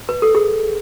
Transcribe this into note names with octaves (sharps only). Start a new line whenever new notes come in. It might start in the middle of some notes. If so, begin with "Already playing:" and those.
B4
A4
G#4